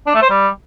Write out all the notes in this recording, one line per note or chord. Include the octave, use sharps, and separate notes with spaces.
D4
A3
C5
G3